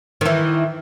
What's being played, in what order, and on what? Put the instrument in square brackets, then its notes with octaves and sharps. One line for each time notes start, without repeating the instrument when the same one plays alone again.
[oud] D#3 E3